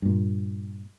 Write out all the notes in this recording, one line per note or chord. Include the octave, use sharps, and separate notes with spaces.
G2 A#2